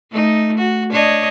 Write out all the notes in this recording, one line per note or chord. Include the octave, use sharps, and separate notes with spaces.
A3 D#4
F#4
D4 C#5 D#5